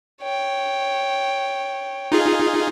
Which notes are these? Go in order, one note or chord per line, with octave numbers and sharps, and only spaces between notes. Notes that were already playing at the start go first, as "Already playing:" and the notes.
C#5 G5
D#4 F4 G#4